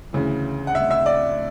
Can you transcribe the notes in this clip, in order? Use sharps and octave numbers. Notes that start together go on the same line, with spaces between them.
D2 C#3 E3
F#5
E5
E5
D5